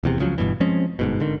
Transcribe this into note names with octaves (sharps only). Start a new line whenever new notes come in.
F1 E2 C3
C#2 C#3 F3 F#3
G1 G2 B2 E3
F3 G#3 C4 C#4
G1 G#2 B2
G#1 D3 D#3